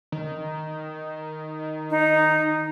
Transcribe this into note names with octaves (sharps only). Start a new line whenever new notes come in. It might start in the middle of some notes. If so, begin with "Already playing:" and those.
D#3
D#4